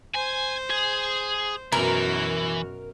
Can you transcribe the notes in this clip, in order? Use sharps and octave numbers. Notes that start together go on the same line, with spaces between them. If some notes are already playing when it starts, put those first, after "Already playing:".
C5 G#5
G#4
F#2 B2 E3 F#4 A#4